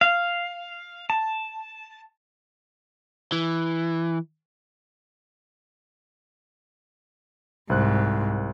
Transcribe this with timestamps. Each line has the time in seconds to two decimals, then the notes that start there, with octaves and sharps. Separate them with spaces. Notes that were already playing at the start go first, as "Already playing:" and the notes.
0.01 F5
1.10 A5
3.32 E3
7.70 C2 G#2 C5 F#6